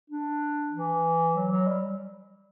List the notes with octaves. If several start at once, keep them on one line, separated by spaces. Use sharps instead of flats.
D4
E3
F#3
F#3
G3